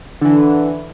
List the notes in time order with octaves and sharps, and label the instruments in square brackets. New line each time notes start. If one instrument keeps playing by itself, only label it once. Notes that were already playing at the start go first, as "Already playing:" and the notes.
[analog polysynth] D3 E3